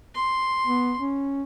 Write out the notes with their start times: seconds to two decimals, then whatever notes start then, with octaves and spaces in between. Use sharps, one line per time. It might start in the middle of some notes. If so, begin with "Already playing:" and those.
0.15 C6
0.67 B3
0.99 C#4